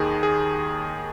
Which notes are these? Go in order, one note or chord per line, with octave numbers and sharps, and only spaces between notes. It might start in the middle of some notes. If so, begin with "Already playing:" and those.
Already playing: D#2 D#3 G#4
G#4